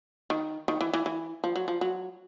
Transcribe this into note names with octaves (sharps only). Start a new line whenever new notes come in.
D#3
D#3
E3
E3
E3
F3
F#3
F3
F#3